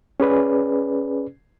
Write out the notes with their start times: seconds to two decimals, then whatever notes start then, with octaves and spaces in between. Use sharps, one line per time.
0.20 C#4 G#4 B4 D5